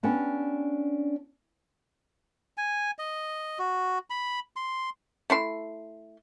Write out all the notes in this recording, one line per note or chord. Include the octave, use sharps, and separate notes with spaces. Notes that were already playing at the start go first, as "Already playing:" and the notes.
B3 C#4 D4 G4
G#5
D#5
F#4
B5
C6
A3 E4 C6